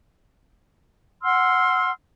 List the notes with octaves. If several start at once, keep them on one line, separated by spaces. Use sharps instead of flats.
F#5 C6 E6 F6